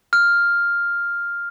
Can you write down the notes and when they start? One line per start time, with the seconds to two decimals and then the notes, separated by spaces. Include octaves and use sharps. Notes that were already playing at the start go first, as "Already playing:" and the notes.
0.13 F6